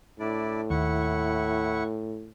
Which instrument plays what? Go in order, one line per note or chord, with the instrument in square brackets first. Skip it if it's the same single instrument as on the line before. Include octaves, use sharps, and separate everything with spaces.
[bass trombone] A2 [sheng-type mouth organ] D4 E4 D5
[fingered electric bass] D#2 [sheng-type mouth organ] E4 F#5 C#6